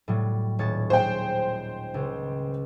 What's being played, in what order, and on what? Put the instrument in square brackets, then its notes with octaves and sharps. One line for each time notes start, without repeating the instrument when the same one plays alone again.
[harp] A2 F#3 G3
D#1 C#5 A6
[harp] G#3 [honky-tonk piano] C5 G5
[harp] C#2